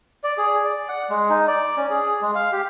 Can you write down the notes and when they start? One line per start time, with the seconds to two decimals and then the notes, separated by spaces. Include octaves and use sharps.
0.24 D5
0.37 G#4
0.64 D5
0.89 F#5
1.09 G#3
1.30 D#4
1.48 D5
1.77 C#4
1.90 G#4
2.22 G#3
2.35 F5
2.52 G4